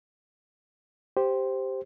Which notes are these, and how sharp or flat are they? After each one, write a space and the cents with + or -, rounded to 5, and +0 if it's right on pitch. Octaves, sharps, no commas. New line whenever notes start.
G4 +0 C5 +0